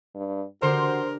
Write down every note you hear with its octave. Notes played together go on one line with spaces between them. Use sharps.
G2
D3 F#4 G4 A#4 C5 C6